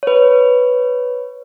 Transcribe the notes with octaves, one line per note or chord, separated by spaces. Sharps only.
B4 C#5